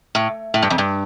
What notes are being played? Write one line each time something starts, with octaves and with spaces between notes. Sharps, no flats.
A2
A2
G2
F2
G2